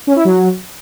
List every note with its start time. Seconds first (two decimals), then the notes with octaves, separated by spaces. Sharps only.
0.07 C#4
0.16 E4
0.25 F#3